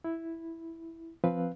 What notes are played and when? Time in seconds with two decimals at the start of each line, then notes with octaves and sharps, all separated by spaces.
0.04 E4
1.24 F3 C4 B4 F5